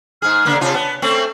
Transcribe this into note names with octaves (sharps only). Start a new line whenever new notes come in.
G#2 G#4 F6
C#3 A#3 D4
C3 F4 A5
B3
A3 C4 C#4 F#7